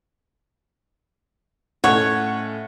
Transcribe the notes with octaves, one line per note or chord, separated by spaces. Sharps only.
A2 C#4 A4 C#5 F#5